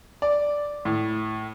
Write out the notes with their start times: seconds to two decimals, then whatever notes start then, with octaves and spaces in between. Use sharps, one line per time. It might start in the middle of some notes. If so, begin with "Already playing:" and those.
0.22 D5
0.85 A2